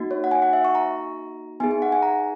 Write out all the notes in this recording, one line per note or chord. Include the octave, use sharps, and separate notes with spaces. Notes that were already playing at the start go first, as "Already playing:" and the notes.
Already playing: A#3 D#4 F#4
C#5
F#5
G#5
F#5
E5
C#6
A#5
B3 D#4 G#4 G#5
G#5
F#5
G#5
A#5